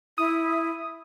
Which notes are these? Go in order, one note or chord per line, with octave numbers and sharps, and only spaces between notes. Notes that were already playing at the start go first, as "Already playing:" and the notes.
E4 D#6